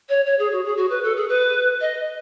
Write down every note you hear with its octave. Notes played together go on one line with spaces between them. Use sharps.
C#5
C#5
G#4
F#4
G#4
F#4
B4
A4
G#4
B4
D#5